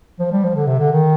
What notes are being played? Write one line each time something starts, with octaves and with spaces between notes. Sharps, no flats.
F3
G3
F3
D3
C3
D3
D#3